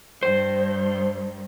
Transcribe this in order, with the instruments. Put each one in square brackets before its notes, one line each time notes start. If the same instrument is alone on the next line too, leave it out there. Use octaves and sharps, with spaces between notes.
[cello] G2 [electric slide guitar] C5